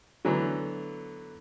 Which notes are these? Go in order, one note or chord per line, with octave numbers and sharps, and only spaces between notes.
D3 E3 F#3 A3 B3